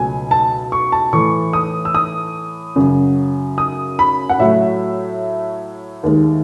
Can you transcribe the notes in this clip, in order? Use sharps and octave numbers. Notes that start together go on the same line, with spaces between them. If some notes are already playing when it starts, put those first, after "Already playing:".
Already playing: C#2 B2 F#3 A3 G#5
A5
C#6
A5
A2 E3 A3 C#6
D#6
E6
D#6
F#2 C#3 F#3
D#6
B5
F#5
A2 F#3 A3 E5
D#2 D#3 G#3